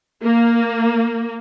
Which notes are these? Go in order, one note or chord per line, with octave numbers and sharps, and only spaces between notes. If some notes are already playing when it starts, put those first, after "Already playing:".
A#3